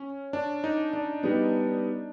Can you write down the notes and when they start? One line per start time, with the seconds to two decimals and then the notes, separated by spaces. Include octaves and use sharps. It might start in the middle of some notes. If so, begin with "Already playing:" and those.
Already playing: C#4
0.33 D4
0.64 D#4
0.93 D4
1.23 G3 B3 D#4